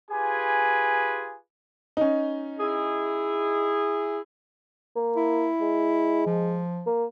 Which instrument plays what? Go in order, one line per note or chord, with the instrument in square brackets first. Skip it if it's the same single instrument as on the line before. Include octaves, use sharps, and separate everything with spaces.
[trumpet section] F4 G4 G#4 B4 G#5
[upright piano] C#4 D#4
[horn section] E4 G#4
[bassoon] A#3
[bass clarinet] E4
[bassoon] G#3
[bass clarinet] F3
[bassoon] A#3